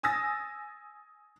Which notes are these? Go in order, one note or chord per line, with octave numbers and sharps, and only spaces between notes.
G#5 D#6 E6 A6 A#6